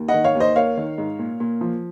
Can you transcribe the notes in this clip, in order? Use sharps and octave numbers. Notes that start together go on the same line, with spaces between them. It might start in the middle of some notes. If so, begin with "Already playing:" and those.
Already playing: D#2
D#5 F#5
D#3
C#5 F5
D#2
C5 D#5
A#3 C#5 F5
D#3
G#2
A#2
A#2
F3